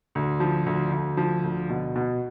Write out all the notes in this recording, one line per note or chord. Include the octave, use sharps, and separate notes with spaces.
D2
F3
D2
D2
F3
D2
B2
B2